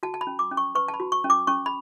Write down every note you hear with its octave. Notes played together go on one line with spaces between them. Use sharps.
F#4 A5
A5
B5
C#4
D6
C#4
C#6
B4 C#6
A5
B5
F#4
C#6
C#4
D6
C#4 C#6
B5